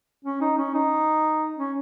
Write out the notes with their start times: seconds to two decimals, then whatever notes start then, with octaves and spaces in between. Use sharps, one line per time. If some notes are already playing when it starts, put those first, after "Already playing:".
0.25 C#4
0.41 D#4
0.58 C#4
0.74 D#4
1.58 C#4